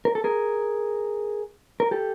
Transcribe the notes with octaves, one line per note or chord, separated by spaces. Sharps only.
A#4
A4
G#4 A#4
A#4
G4 A4